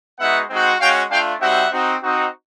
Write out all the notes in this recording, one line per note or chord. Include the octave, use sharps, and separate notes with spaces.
G#3 B3 D#4 F#4 E5 F#5
G#3 C4 D#4 F#4
G#3 C#4 F#4 F5 G5
A3 D4 F4 F5 G5
G3 C4 D#4 F#4 E5 F#5
C4 D#4 F#4
C4 D#4 F#4